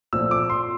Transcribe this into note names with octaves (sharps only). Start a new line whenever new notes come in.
A#2 F3 A3 C4 E6
D6
C6